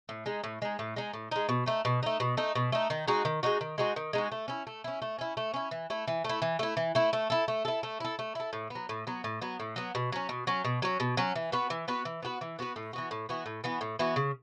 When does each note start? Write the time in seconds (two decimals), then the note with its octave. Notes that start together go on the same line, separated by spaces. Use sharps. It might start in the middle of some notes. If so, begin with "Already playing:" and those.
0.09 A2
0.26 G#3 D#4
0.44 A2
0.62 G#3 D#4
0.79 A2
0.96 G#3 D#4
1.13 A2
1.31 G#3 D#4
1.49 B2
1.66 A3 D#4
1.85 B2
2.03 A3 D#4
2.20 B2
2.37 A3 D#4
2.55 B2
2.72 A3 D#4
2.90 D#3
3.07 G#3 D#4 F#4
3.25 D#3
3.43 G#3 D#4 F#4
3.61 D#3
3.78 G#3 D#4 F#4
3.96 D#3
4.13 G#3 D#4 F#4
4.31 A3
4.48 C#4 E4
4.67 A3
4.84 C#4 E4
5.02 A3
5.19 C#4 E4
5.37 A3
5.54 C#4 E4
5.71 E3
5.90 A3 E4
6.08 E3
6.24 A3 E4
6.42 E3
6.59 A3 E4
6.77 E3
6.95 A3 E4
7.13 A3
7.30 E4 A4
7.48 A3
7.65 E4 A4
7.83 A3
8.00 E4 A4
8.19 A3
8.35 E4 A4
8.53 A2
8.70 F#3 B3
8.89 A2
9.07 F#3 B3
9.24 A2
9.42 F#3 B3
9.60 A2
9.76 F#3 B3
9.95 B2
10.12 F#3 C#4
10.29 B2
10.47 F#3 C#4
10.65 B2
10.82 F#3 C#4
11.00 B2
11.17 F#3 C#4
11.35 E3
11.52 B3 F#4 B4
11.70 E3
11.88 B3 F#4 B4
12.05 E3
12.22 B3 F#4 B4
12.41 E3
12.59 B3 F#4 B4
12.76 A2
12.93 E3 B3 F#4
13.11 A2
13.29 E3 B3 F#4
13.46 A2
13.64 E3 B3 F#4
13.81 A2
13.99 E3 B3 F#4
14.16 C#3